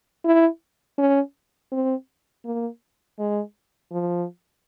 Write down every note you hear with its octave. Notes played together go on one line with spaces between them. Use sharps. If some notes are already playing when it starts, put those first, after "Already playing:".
E4
C#4
C4
A#3
G#3
F3